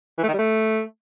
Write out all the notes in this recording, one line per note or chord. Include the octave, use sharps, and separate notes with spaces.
E3
A3
D#3
G3
A3